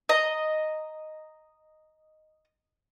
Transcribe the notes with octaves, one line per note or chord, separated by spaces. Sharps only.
D#5 A#5